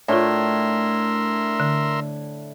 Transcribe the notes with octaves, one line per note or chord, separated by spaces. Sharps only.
A2 D4 F4 A#4 C#5 E5 C6
D3